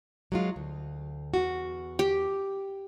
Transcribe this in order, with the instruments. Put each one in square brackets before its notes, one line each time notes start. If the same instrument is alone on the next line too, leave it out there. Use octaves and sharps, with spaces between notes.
[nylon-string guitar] F#3 G#3 F4
D2
E2 F#4
[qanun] G4